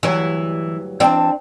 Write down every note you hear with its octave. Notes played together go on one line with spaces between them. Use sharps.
D2 G2 E3 F#3
E3 C4 D4 G5 A5